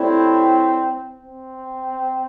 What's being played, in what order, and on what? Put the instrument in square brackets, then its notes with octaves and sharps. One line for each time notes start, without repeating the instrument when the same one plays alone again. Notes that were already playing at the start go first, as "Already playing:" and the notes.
Already playing: [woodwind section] A2 G3 E4 [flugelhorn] C4
[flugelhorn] C4